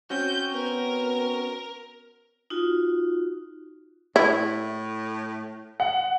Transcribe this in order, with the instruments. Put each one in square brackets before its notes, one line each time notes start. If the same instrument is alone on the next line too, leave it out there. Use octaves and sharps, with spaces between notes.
[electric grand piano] C4 C#4 F#4 [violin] G6
[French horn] B3 [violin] A#4
[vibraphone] D#4 F4 F#4
[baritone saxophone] A2 [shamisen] E4
[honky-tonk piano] F#5